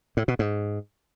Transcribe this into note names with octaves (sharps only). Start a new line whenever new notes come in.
A2
B2
G#2